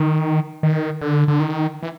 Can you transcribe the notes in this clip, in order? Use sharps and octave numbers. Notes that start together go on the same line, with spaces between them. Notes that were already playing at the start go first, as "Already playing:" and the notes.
Already playing: D#3
D#3
D3
D3
D#3
E3